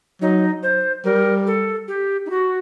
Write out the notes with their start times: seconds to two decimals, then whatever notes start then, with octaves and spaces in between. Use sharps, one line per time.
0.22 F#3 D#4
0.63 C5
1.05 G3 A#4
1.47 A4
1.88 G4
2.26 D#4
2.30 F#4